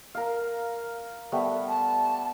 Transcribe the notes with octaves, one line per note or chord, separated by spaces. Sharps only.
A#4 F5
G3 A3 B3
A5